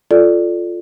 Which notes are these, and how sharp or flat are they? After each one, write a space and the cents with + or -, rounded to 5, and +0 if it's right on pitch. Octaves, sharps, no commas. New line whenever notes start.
F4 +0 A4 -10 D5 +0